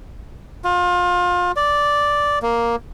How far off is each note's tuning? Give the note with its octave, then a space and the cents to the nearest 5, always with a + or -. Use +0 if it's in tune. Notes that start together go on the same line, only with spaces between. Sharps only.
F4 +30
D5 -5
A#3 +5